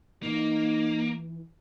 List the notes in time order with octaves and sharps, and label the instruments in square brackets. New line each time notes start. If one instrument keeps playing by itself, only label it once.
[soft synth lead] E3 [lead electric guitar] A#3 [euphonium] D#4